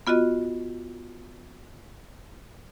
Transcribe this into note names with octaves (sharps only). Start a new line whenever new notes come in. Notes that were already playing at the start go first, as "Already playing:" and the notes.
B3 F4 F#4 D#5